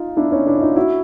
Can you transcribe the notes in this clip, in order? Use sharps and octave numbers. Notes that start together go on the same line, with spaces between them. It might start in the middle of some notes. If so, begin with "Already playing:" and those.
Already playing: D#4 F4
D4 E4
C#4 D#4
D4 E4
E4
D#4 F4
E4 F#4